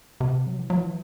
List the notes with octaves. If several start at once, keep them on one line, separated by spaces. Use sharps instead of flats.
C3
F#3
E3
F#3
E3